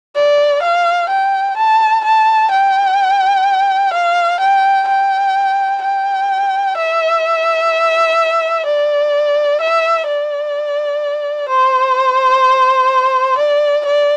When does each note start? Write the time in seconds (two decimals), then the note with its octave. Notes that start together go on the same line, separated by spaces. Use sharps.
0.16 D5
0.63 F5
1.09 G5
1.57 A5
2.05 A5
2.51 G5
3.93 F5
4.40 G5
4.88 G5
5.82 G5
6.77 E5
8.66 D5
9.61 E5
10.07 D5
11.49 C5
13.38 D5
13.85 D5